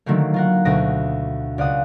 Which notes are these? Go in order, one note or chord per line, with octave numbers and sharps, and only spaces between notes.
D3 D#3 F#3 A3 A#3
F4 A#4 F#5
D2 B2 D#6 A#6 D7
C#2 D5 F5 F#5 D#6